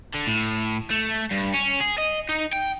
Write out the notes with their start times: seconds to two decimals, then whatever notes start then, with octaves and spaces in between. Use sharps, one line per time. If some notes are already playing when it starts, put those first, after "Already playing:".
0.14 D3
0.27 A2
0.90 A3
1.31 G2
1.54 C#4
1.80 G#4
1.98 D#5
2.29 D#4
2.53 G5